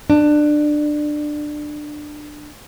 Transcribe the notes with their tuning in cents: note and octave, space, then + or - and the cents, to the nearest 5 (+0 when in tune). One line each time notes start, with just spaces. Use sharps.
D4 +20